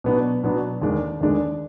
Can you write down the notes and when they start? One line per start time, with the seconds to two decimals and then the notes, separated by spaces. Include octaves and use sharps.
0.04 B2 F#3 B3 D4
0.44 B2 F#3 B3 D4
0.81 D#2 D3 G#3 D4
1.21 D#2 D3 G#3 D4